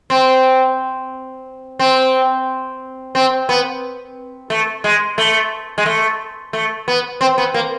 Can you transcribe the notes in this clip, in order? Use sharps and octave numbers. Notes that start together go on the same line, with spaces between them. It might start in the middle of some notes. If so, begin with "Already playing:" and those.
C4
C4
C4
B3
A3
G#3
A3
G#3
A3
A3
B3
C4
B3
A#3